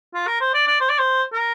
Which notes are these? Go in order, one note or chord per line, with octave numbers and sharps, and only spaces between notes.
F4
A#4
C5
D5
D5
C5
D5
C5
A#4